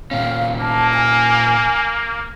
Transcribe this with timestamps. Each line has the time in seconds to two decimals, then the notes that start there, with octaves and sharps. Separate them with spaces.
0.11 A#2 C#4 F5
0.61 A#3 A5
0.94 G#5